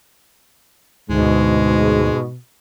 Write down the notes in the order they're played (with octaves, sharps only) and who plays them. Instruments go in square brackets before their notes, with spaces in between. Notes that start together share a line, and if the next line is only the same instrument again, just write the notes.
[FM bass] D2 [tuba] G#2 [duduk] B2 [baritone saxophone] G#3